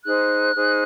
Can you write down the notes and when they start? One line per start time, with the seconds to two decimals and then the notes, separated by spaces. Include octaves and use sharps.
0.04 D#4 G#4 C5 F#6
0.55 D#4 G#4 C5